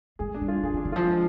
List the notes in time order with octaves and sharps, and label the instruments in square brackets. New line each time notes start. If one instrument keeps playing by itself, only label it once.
[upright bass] G#3 [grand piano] G#4
[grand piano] D4
[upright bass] G3
[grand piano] F4
[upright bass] F3 [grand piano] G#4
[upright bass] D#3
[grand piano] D4
[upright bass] D#3
[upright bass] F3 [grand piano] F4
[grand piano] G#3